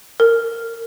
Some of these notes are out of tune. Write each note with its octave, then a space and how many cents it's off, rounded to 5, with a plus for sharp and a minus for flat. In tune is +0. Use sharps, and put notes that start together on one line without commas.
A#4 -25